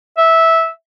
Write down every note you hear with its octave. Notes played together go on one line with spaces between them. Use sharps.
E5